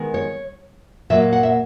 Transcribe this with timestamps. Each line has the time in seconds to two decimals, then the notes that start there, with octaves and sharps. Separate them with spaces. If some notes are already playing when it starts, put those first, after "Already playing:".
Already playing: D#3 G#3 B3
0.14 C#5
1.10 A#2 F#3 A#3 E5
1.33 F#5
1.43 E5